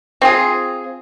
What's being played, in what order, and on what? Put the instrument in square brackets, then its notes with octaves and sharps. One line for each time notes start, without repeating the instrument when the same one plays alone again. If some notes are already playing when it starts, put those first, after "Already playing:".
[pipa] C4 F4 G#4